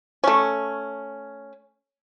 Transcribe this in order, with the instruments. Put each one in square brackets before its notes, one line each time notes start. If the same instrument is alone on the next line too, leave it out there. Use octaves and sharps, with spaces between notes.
[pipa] A3 C#4